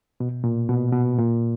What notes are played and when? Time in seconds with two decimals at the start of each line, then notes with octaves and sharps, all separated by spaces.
0.20 B2
0.44 A#2
0.69 B2
0.93 B2
1.18 A#2